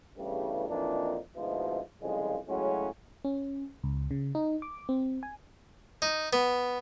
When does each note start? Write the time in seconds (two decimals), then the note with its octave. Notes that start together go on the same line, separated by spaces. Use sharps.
0.18 A1 E2 G2 C#3 G3 A3
0.69 F2 A#2 E3 D4 D#4
1.36 D2 G#2 B2 F3 E4
2.02 C2 F2 C#3 F3 G#3
2.48 A2 C#3 F#3 G#3 C#4 F#4
3.25 C#4
3.84 C#2
4.11 C#3
4.35 D#4
4.62 D6
4.89 C4
5.23 G#5
6.02 D#4
6.33 B3